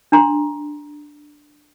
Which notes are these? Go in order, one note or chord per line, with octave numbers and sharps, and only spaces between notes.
D4 A#5 C6